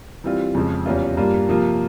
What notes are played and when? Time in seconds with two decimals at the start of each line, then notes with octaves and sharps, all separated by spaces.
0.24 E3 G3 C4 F4
0.55 F2 C#3 F3 G#3
0.86 E2 C3 G3 C#4 F4
1.17 G2 G3 A#3 F4
1.48 C3 F3 A#3 F4